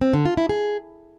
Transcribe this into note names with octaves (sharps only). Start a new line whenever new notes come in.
C4
D3
F4
E4
G#4